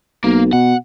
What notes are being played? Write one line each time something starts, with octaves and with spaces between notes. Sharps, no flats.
B1 A#3
B2 F#5